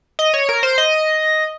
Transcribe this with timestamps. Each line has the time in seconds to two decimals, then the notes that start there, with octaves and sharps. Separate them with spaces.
0.19 D#5
0.34 C#5
0.49 A#4
0.63 C5
0.78 D#5